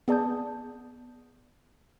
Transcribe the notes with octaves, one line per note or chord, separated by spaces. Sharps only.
B3 G#4 D5 A5 D#6 G6